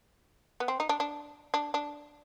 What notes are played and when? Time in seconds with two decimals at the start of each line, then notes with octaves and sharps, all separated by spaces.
0.60 B3
0.68 C4
0.80 D#4
0.89 D4
1.00 D4
1.54 D4
1.74 D4